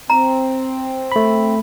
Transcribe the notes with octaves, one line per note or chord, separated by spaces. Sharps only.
C4 A#5
A3 B5